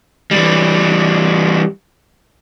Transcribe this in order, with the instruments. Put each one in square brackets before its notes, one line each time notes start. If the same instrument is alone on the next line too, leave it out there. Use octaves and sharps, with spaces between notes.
[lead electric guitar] E3 G3